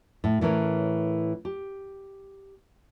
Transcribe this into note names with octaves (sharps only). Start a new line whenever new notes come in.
A2
A2 E3 C#4 A#4 C#5
G4